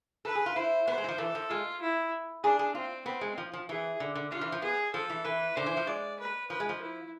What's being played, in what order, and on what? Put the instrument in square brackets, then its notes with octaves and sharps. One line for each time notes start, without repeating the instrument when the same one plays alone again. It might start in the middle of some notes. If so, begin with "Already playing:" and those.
[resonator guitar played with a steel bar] A4 [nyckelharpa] B4
[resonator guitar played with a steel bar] G#4
F4
[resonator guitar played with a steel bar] E4 [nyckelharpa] C5
[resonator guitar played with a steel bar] B3 [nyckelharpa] C5
[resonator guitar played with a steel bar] G#3
E3
F3
[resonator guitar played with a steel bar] E3 [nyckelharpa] A4
[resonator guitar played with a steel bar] F3
[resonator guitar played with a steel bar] G#3 [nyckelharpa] F4
[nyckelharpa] E4
[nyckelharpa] D4 [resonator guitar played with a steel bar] G#4
[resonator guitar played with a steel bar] G#4
[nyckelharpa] C4 [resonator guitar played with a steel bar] F4
[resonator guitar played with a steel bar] B3 [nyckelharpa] C4
[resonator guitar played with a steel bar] G#3
F3
F3
[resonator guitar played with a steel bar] E3 [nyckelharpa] G#4
[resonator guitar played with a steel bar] D3
D3
[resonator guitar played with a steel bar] D3 [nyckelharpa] F4
[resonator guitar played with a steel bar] E3
F3
[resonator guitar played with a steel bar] B3 [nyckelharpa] G#4
[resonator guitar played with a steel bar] F3 [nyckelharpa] A4
[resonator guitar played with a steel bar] E3
[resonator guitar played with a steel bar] E3 [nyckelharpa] B4
[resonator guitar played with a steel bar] D3 [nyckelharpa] C5
[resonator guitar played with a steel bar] E3
F3
[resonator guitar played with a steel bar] G#3 [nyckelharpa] D5
[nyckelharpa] B4
[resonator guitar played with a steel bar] F3 [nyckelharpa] B4
[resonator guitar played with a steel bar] G#3
F3
[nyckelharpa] E4